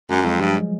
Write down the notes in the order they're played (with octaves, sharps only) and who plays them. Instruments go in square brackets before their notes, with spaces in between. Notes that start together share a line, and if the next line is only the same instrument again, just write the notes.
[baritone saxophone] F#2 [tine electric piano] F#3 G#3
[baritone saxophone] F2 [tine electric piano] F#3 G#3
[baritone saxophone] G2 [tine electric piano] F3 G3
[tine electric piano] F#3 G#3